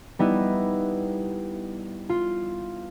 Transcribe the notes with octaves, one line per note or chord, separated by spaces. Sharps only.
G3 B3 D#4 E4
F4